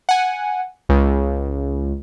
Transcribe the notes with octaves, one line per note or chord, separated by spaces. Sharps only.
F#5 G#5
C#2